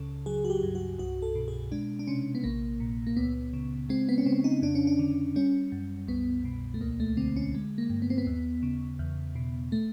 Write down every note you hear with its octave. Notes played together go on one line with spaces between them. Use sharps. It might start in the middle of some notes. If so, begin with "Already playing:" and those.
Already playing: C#2 C#3 A4
F#3 G#4
F#4
G4
G2
F#4
C2 F#4
A4
B2
G#4
G#3 D4
D4
C3 C#4
B3
A#1 A#3
A#2
A#3
C#2 B3
C#3
G#3 C4
B3
C#4
C#3 C4
D#4
F2 D4
C#4
D4
D3
G3 C#4
F#2
C2 B3
B2
A3
D2 A#3
A3
D3 C4
C#4
G#3
A#3
G2
B3
C4
B3
D#2
C#3
E2
B2
A3